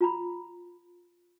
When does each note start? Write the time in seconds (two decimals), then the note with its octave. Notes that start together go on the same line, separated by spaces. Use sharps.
0.01 F4 A#5 B5